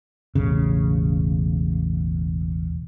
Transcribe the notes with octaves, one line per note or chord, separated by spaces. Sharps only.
E1 A1 C#3